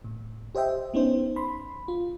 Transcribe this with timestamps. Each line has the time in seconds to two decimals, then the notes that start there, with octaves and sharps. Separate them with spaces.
0.04 A2
0.55 G4 C5 D#5 E5 G5
0.94 B3 C#4 D#4 C5
1.36 B5 C6
1.88 F4